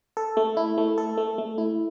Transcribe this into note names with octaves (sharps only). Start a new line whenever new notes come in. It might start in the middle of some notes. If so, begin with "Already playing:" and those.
A4
A3
E4
A3
A4
A3
A3
E4